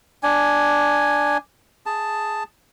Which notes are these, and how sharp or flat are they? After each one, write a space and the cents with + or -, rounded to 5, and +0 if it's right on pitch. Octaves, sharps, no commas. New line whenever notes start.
D4 +0 G#5 +0
G#4 +0 A5 +0